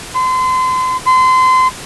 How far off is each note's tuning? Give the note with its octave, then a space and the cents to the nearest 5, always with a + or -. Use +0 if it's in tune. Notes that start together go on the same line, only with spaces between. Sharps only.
C6 -35
C6 -30